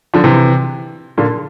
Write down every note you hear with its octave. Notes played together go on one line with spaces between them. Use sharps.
D3 F3
C3 E3
A#2 D3